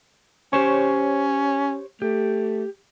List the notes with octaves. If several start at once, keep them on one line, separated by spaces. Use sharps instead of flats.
C#4 G4 C5 C#5
A3 G4